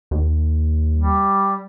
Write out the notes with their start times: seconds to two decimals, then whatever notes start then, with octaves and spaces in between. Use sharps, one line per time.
0.11 D#2
0.96 G3